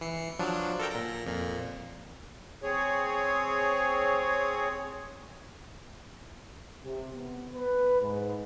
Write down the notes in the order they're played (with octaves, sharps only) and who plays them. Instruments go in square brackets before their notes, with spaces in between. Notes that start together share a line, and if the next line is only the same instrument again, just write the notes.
[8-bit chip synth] E3 C7 C#7
F3 F#3 D4
A4 A#4 G5
A#2 A#6
F2 A#2
[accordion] C4 G#4 C#5
[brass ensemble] C3
B3
B4
G#2